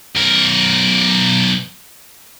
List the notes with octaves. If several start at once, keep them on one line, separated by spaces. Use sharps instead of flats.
B1 A#4